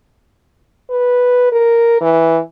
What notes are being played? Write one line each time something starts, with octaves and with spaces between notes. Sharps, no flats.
B4
A#4
E3